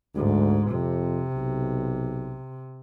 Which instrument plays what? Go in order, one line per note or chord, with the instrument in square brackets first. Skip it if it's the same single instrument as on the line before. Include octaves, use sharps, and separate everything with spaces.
[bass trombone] D2 [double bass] G#2
[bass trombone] F2 [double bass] C3
[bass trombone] B1